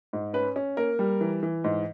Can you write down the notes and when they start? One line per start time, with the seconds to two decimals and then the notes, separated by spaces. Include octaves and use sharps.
0.13 G#2
0.34 C#4 B4
0.56 C#4
0.77 A#3 A#4
0.99 G3
1.21 E3
1.43 E3
1.64 G#2